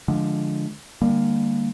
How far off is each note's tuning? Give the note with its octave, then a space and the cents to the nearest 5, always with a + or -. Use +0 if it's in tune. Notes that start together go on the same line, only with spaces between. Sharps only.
D3 +5 F3 +0 G#3 +15
D3 +45 G3 +35 A#3 +0